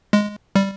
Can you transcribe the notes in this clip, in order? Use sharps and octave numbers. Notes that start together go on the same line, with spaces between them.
G#3
G3